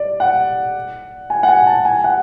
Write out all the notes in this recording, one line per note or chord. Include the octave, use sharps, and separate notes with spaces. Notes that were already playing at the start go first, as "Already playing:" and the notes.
Already playing: D5
F#5
G#5
F#5
G#5
A5
G#5
F#5